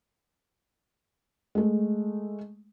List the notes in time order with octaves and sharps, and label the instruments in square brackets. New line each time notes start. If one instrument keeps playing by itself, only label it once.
[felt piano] G#3 A3